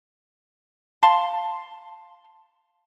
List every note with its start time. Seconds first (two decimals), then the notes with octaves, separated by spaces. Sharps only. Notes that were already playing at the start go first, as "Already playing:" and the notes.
1.03 F5 A5 C6